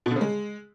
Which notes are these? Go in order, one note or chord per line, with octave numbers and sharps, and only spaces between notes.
B2
D3
C#3
G#3